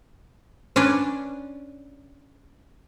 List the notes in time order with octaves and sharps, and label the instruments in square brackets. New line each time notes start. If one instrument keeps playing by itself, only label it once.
[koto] C#4 D4 B4 D5